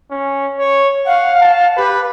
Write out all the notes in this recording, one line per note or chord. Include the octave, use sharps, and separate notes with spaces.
C#4
C#5
F5 F#5
A5
G4 B4